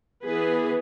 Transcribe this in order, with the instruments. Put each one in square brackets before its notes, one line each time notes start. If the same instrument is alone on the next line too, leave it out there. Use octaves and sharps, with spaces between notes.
[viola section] E3 B3 G#4 B4